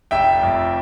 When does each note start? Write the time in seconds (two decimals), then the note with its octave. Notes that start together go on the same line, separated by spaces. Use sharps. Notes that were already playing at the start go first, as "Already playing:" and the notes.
0.11 F1 E5 G5
0.43 F2